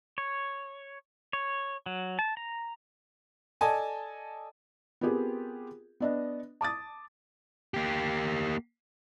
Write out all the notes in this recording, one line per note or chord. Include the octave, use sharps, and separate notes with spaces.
C#5
C#5
F#3
A5
A#5
A4 D5 D#5 G#5 A5
B3 C4 F4 G4 G#4 A#4
B3 D4 D#5
A5 D6 D#6 A6
A#3 G4